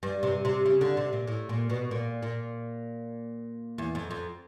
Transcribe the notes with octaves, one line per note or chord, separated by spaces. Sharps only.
G2
C3
C3
C#3
D3
C3
A#2
A2
A#2
B2
A#2
A#2
E2
F2
F2